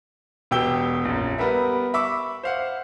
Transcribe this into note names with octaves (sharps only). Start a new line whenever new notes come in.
E1 B2 G4 G5 E6 G7
A#1 F#2
G3 B3 A#4 B4 E5
E5 B5 C#6 D6 E6
C5 F5 F#5